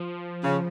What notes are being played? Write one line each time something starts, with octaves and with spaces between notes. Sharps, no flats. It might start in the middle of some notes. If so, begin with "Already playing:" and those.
Already playing: F3
C#3